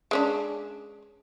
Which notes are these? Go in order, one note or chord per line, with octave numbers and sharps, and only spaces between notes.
G#3 C#4 D4